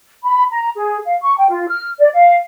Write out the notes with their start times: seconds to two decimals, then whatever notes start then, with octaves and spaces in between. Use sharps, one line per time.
0.24 B5
0.51 A#5
0.75 G#4
1.05 F5
1.20 C#6
1.36 G5
1.49 F4
1.68 F6
1.98 D5
2.13 F5